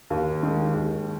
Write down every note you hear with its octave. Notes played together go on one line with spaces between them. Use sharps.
D#2
D#3 G#3
D#2